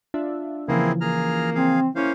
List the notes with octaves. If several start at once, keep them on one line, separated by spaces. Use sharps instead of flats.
D4 F4 E5
C#3 E3 F3 A#3 C4 E4 G#4
A#3 G#4 A#5 F6
C4 G#4 F5
A#3 C#4 E4 C5 F5